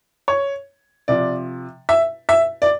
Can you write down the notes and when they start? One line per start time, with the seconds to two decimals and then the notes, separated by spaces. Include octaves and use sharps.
0.28 C#5
1.08 C3 F3 D5
1.89 E5
2.29 E5
2.62 D5